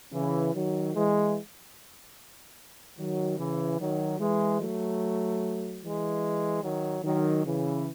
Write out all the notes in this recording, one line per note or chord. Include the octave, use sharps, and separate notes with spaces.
C#3 E3
D#3 F#3
E3 G#3
D#3 F#3
C#3 E3
D#3 F#3
E3 G#3
F#3 A3
E3 G#3
D#3 F#3
D#3 F#3
C#3 E3